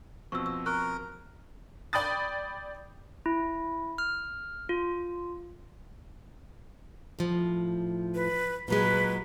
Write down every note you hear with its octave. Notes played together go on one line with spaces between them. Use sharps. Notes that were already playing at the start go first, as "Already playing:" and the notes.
B2 F3 C4 C#6 E6
E6
A#4 C#6 F#6
D5 G5 B5 D#6 A6
E4
F6
F4
A2 F3
B4
A#2 F#3 G#3 B4